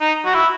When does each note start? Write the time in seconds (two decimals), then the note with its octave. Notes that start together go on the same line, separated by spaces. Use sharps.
0.01 D#4
0.25 F#4
0.34 E4